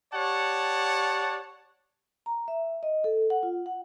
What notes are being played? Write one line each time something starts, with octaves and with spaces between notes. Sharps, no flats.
G4 C#5 D5 F#5 A5
A#5
E5
D#5
A4
F#5
F4
F#5